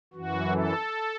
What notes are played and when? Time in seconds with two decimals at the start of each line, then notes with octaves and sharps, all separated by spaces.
0.14 F#2 E3 F#4
0.51 A4